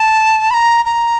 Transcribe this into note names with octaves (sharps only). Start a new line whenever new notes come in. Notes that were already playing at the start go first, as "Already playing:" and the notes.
Already playing: A5
B5
A#5
A#5